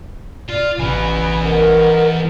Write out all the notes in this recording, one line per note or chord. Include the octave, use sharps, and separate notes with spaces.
F4 D5
A1 C#3 E3 B3 G#5 B5
A#4 D#5 F#5 A6